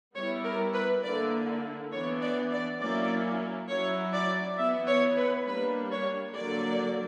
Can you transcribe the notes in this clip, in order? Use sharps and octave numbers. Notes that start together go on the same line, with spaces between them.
G3 B3 E4 C#5
A#4
B4
D3 A#3 E4 D5
E3 B3 D4 C#5
D5
D5
F#3 A#3 C#4 E4 D5
F#3 C#4 E4 C#5
D5
E3 B3 E4 E5
C#5
B4
G3 A#3 D4 B4
C#5
D3 F#3 A#3 D5